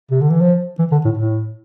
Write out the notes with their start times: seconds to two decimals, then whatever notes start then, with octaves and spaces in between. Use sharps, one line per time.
0.11 C3
0.21 D3
0.30 E3
0.41 F3
0.79 E3
0.92 D3
1.05 A2
1.18 A2